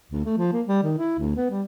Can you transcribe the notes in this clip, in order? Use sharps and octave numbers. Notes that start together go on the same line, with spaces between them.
D2
A3
F3
A#3
G3
D#3
E4
D2
B3
G3